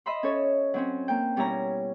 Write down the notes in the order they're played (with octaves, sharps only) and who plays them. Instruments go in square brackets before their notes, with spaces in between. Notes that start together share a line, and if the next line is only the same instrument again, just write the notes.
[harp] D#5 E5 B5 C6
C#4 A4 C#5
F#3 C4 C#4
A#3 G5
B2 G3 C#4 E4 C#5 A#5